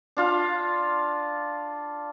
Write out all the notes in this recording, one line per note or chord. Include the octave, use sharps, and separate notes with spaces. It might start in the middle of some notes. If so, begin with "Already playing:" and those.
D4 F4 F5 C6